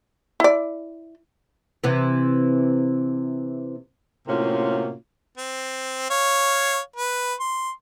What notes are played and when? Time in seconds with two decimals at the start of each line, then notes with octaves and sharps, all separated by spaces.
0.40 E4 D5
1.84 C3 E3
4.28 A2 C3 A#3 C#4 F4 F#4
5.37 C4
6.10 C#5 F5
6.96 B4
7.40 C6